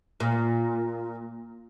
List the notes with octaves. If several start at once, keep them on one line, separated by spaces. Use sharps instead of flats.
A#2